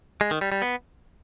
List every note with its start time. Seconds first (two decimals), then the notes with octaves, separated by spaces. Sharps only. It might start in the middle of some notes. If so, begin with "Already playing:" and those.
0.21 G#3
0.31 D#3
0.41 G3
0.52 G3
0.62 B3